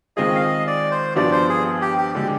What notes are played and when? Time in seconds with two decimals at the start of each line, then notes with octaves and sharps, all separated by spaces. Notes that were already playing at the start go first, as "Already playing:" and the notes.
0.17 D#3 G#3 C4 F4 G#4 D#5
0.35 F5
0.41 D#5
0.67 D5
0.91 C5
1.16 G2 F3 B3 D4 D5
1.32 C5
1.49 G#4
1.81 G4
1.98 G4
2.15 D3 G#3 G4